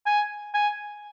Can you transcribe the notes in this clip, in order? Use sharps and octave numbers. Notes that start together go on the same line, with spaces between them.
G#5
G#5